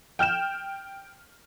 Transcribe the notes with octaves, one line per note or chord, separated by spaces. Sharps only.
G5 F6 G6 E7